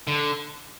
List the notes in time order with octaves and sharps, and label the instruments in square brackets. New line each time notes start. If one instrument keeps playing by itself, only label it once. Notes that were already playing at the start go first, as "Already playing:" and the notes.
[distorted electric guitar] D3